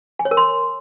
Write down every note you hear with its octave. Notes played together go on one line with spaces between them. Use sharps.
G#5
C#5
A#4
C6